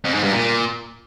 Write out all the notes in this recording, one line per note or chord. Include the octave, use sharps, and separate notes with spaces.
F2
G#2
G2
A#2